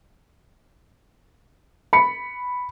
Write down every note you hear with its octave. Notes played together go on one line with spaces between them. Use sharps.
B5 C#7